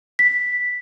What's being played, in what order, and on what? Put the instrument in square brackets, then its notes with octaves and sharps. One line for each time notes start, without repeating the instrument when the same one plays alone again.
[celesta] B6